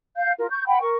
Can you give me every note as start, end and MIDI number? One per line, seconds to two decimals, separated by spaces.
0.17 0.32 77
0.17 0.32 91
0.39 0.47 65
0.39 0.47 70
0.51 0.66 85
0.51 0.66 91
0.67 0.81 78
0.67 0.81 79
0.67 0.81 83
0.82 0.97 70
0.82 0.97 85